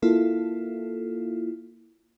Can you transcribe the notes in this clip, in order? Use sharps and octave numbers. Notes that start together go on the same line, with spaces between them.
A#3 E4 F4 A4